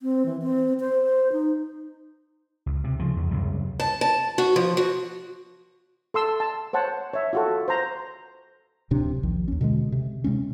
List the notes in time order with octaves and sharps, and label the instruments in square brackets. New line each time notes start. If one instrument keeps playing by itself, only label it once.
[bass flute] C4
E3
C4
C5
D#4
[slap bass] C#2
C3
C#3 F3
E2
C#2 F#2 C3 G3
[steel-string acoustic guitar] A5
A5
F#4
F3
F#4
[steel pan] A4 C6 E6
A5
C5 C#5 F#5 A5
C#5 E5
F4 F#4 A4
C5 A#5
[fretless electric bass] D1 A2 C3 D4
A#1 D#2
D#2 C#4
B2 D3 G#3
C3
C3 D#3 G#3 C#4